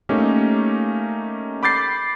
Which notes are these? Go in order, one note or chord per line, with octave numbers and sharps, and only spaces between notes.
A3 A#3 C#4 D#4 G4
B5 D6 G6 A6 C7